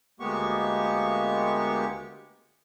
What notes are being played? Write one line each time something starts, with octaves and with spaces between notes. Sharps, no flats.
D2 G#3 A#3 B3 G4 C#6